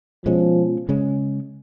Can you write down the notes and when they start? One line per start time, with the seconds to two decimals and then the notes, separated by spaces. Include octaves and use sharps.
0.26 B2 F3 G#3 C#4
0.89 C#3 G#3 C#4